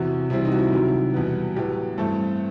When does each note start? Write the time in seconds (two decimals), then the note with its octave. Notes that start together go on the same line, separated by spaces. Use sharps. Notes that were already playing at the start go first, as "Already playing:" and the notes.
Already playing: E2 C3 E3 F#4
0.30 C3 E3 G3 C4 E4
0.45 D#4
0.52 F#4
0.59 E4
0.72 C3 D#3 F#3
1.14 E2 B2 G3 B3
1.56 A2 F#3 B3 G4
1.98 G2 E3 A3 C4 A4